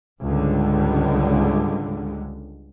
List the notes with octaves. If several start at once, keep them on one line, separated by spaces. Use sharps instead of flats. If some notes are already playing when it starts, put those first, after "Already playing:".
C#2 G#2 D3 G3 G#3